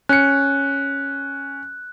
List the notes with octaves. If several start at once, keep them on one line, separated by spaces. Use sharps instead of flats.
C#4 F#6 C#7